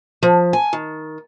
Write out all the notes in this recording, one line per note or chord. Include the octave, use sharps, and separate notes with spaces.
F3
G#5
D#3